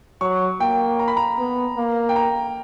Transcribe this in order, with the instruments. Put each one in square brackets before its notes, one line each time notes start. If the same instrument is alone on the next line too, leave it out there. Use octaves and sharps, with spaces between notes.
[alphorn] F#3 [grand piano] C#6
[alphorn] A#3 [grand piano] G5
[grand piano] A#5
B5
A#5
[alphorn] B3
A#3
[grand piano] G5
A#5